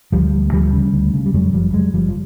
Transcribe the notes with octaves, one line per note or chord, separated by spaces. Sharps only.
D2 F3 G3
D2
D2 F3 G3
C#3
D2
C#3
G3
F2 F#3 G#3
F#1 F3 G3
F2 F#3 G#3
F#1 F3 G3
F3